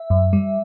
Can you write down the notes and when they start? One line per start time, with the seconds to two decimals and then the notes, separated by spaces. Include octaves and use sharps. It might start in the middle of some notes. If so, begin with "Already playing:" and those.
Already playing: E5
0.10 F#2
0.33 G3